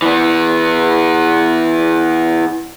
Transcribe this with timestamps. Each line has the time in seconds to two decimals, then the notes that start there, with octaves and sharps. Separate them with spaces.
0.02 E3 B3